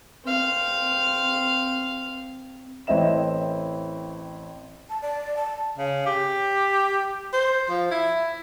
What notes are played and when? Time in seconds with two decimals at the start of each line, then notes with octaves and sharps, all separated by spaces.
0.24 C4 F5
2.87 A1 C4 E4 D#5 E5 E7
4.90 A5
5.02 D5
5.37 A5
5.78 C#3
6.06 G4
7.33 C5
7.70 F3
7.91 E4